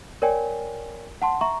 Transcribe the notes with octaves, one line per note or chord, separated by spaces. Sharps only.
A#4 C#5 D5 G5 G#5
F#5 A5 C6
E5 A#5 C#6